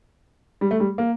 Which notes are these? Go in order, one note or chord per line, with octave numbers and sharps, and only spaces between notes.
G3
A3
G3
A#3